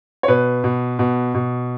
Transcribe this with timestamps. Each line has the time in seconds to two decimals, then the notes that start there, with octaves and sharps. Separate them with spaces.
0.23 C#5
0.28 B2 B4
0.64 B2
0.99 B2
1.34 B2